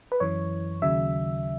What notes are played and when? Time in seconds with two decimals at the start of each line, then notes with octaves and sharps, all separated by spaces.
0.12 B4
0.20 F#2 E3 C#5
0.82 D#2 C#3 F#3 E5